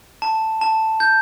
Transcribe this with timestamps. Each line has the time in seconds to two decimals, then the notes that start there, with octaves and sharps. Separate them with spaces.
0.22 A5
0.61 A5
1.00 G6